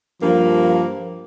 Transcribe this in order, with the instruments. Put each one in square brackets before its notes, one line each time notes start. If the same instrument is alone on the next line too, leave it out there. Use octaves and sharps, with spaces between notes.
[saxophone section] G2 A#3 [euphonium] F3